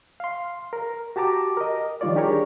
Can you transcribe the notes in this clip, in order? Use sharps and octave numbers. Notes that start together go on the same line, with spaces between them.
F5 C6
A#4
F#4 G4 A5 A#5 D6
A#4 D#5
D#3 F3 G3 F4 C#5 D5
D4 G4 G#4 A#4 C#5